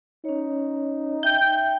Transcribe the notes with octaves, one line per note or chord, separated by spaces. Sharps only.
C#4 D#4 C#5
E5 G5 G6